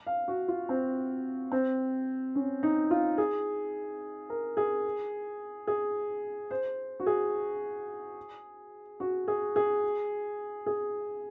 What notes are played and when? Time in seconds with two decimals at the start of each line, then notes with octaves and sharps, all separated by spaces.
0.07 F5
0.28 F#4
0.48 F4
0.69 C4
1.52 C4
2.35 C#4
2.63 D#4
2.91 F4
3.18 G#4
4.30 A#4
4.57 G#4
5.67 G#4
6.51 C5
7.00 F#4
7.06 G#4
9.00 F#4
9.28 G#4
9.56 G#4
10.66 G#4